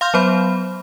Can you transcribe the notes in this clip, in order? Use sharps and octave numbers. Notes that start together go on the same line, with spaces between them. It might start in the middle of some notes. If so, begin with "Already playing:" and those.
F5 C6 F6 G6
F#3 B3 C5 B5